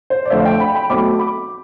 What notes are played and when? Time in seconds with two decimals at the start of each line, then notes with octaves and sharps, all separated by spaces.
0.10 C5
0.25 D5
0.30 F2 D3 A3 C5 E5
0.38 F5
0.45 E5 G5
0.60 G5 B5
0.75 G5 B5
0.90 B1 B2 A3 C4 B5 D6
1.19 B5 D6